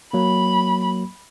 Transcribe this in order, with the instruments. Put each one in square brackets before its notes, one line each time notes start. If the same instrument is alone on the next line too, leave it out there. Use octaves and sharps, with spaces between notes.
[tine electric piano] F#3 A#3 [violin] B5